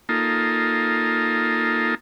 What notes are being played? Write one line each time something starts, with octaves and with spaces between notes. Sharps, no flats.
A#3 D#4 F4 A4